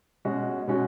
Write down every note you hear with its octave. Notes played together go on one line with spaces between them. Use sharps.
B2 G#3 C#4 F#4
B2 G#3 C#4 F#4